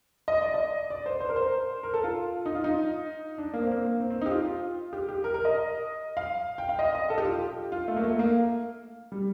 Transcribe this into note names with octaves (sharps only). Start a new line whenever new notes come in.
D#5
D5
D#5
D5
C5
C5
A#4
C5
A#4
A4
F4
D#4
F4
D#4
D4
A#3
C4
A#3
C4
C4
D#4
G4
F4
G4
G4
A#4
A#4
D#5
F5
G5
F5
D#5
D#5
A4
G4
F4
G4
F4
A3
A#3
A3
A#3
G3